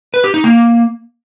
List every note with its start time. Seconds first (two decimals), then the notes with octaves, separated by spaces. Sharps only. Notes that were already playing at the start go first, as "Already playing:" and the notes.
0.14 B4
0.24 G4
0.34 D#4
0.44 A#3